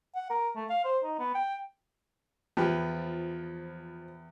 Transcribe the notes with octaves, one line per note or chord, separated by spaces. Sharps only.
F#5
A#4
A3
F5
C5
D#4
B3
G5
E2 F3 G4 B4